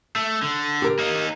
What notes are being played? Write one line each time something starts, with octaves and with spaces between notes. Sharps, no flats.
A3
D3
G4 A#4
A#3 D#4